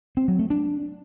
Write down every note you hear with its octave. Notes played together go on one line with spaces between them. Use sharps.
C4
F#3
A3
D4